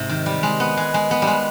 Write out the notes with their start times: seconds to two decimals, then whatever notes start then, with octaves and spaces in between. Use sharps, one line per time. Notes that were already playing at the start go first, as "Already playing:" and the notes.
Already playing: G#2 C3
0.09 D#3
0.26 G3
0.43 G#3
0.60 B3
0.77 G#3
0.94 G#3
1.11 B3
1.22 G3
1.27 G#3